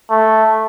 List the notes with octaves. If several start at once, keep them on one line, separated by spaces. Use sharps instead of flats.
A3